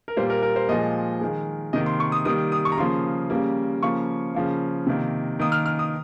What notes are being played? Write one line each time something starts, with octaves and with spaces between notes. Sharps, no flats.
A#4
A#2 G3 A#3 C5
A#4
A#4
C5
A#2 F3 G#3 D#5
D#3 G#3
C3 D#3 A#3 D#5
C6
C#6
D#6
D#3 G3 A#3 D#6
D#6
C#6
A#5
C#3 F3 A#3 C6
C#3 G3 A#3
C#3 F3 A#3 C#6
C#3 F3 A#3
C3 D#3 A#3
D#3 A#3 D#6
F6
F6
D#6